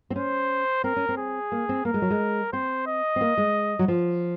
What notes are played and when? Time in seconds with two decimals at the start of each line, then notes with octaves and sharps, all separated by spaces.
0.10 C4
0.16 C#4 C5
0.84 C4 A#4
0.96 C#4
1.09 C4
1.18 G#4
1.52 A#3
1.69 C4
1.85 A#3 A#4
1.94 G#3
2.02 F#3
2.10 G#3
2.53 C4 C5
2.87 D#5
3.16 C4
3.21 A#3
3.37 G#3
3.79 F#3
3.88 F3